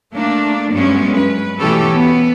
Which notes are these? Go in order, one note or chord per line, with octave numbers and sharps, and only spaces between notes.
A3 A#3 D4
G2 F#3 G#3 A3 B3 C#4
B4
B2 E3 A3 C#4 G4 A4
B3